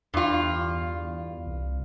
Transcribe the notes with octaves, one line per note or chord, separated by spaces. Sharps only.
E2 G2 F4
C2